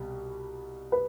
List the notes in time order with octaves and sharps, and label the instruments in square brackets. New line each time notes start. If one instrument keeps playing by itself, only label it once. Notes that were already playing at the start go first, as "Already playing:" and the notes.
Already playing: [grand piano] C2 B2 G3
[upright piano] B4